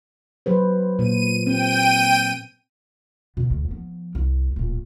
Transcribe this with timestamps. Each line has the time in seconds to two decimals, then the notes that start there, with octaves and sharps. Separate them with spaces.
0.46 F#3 B4 C5
0.99 A#2 D#7
1.47 C4 G5 D#7
3.37 B2 D3
3.50 D2
3.68 F3 B3
4.15 C2
4.56 D1 A#2